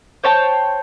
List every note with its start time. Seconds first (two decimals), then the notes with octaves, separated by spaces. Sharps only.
0.24 C5 C#5 G5 A5